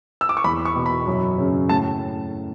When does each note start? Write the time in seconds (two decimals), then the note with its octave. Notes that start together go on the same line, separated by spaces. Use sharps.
0.21 E6
0.29 D6
0.37 C#6
0.44 E2 B5
0.65 C#6
0.76 B2
0.86 B5
1.07 F#2
1.38 C#3
1.69 A2 A5